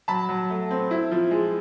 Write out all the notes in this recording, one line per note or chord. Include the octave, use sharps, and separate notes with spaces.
F#3 A5 B5
F#3
A3
C4
E4
F3
G#3